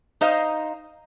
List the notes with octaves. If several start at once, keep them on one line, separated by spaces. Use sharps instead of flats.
D#4 C5 D#5 F5